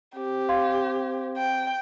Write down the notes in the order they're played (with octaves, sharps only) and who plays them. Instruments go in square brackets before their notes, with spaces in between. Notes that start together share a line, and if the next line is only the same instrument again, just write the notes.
[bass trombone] C4 [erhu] G4
[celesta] F5 C6 G#6
[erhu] G5